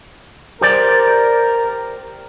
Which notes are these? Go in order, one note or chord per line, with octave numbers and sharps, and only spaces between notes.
G4 A#4 C5 D5